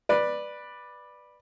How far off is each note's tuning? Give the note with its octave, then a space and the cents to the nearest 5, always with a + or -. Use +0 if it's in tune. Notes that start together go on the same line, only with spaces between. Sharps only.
B4 -10 D5 +10